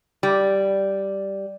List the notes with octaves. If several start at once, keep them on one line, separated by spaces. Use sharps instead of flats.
G3